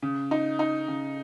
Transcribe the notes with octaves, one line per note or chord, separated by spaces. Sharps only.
C#3
D#4
D#4
C#3